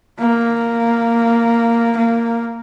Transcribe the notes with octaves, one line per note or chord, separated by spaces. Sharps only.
A#3
A#3